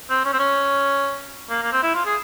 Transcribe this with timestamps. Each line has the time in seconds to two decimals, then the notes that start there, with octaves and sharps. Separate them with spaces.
0.10 C4
0.25 C#4
0.33 C4
0.39 C#4
1.50 A#3
1.63 A#3
1.72 C4
1.83 E4
1.94 F4
2.05 G#4